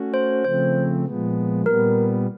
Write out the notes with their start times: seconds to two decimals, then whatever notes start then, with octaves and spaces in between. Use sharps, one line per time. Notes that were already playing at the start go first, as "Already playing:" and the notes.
Already playing: A3 C#4 F#4
0.14 C5
0.44 C#3 F3 A3 C4 C5
1.05 A#2 F3 G#3 B3
1.66 A#2 G3 B3 A#4